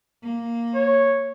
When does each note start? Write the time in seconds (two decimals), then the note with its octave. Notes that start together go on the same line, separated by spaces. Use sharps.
0.23 A#3
0.75 C#5